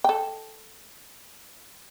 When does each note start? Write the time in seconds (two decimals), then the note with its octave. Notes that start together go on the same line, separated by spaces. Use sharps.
0.04 A4 G5